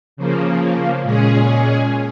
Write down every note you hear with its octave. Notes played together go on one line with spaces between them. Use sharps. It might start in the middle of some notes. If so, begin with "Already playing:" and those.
C#3 F3 A#3
A#2 G#3 C#4 G#4